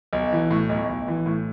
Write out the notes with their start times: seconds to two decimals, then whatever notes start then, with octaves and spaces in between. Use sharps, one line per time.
0.13 B1
0.32 E3
0.51 A2
0.69 B1
0.89 B1
1.08 E3
1.26 A2